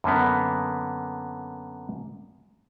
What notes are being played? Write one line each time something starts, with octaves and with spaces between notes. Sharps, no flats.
F#2 D3 A#3 B3